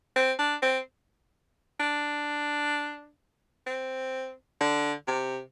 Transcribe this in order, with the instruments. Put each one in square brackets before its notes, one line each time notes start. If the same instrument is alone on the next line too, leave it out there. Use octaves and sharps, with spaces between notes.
[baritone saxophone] C4
D4
C4
D4
C4
D3
C3